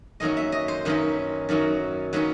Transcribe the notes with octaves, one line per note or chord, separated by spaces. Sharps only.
F#2 D#3 F#3 A#3 C#4 D#5
E5
D#5
C5
F#2 D#3 F#3 A#3 C#4 B4
F#2 D#3 F#3 A#3 C#4
D#3 F#3 A#3 C#4 B4